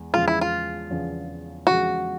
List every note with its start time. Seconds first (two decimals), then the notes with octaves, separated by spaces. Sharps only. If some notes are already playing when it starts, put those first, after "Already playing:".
Already playing: E2 G#3
0.13 E2 C#3 F3 G#3 F4
0.28 E4
0.41 F4
0.90 E2 C#3 F3 G#3
1.67 E2 C#3 F3 G#3 F#4